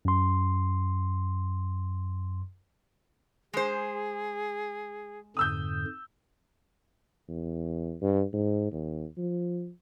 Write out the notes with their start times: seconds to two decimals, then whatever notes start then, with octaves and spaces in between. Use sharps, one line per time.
0.05 F#2 C6
3.53 G#3 G#4 C5
5.37 F2 G#2 D3 D#6 E6 G6
7.28 E2
8.01 G2
8.33 G#2
8.72 D#2
9.17 F3